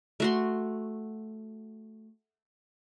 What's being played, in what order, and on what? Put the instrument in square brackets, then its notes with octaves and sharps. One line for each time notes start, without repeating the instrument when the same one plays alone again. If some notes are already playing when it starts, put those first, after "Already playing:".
[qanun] A3 F#4 C6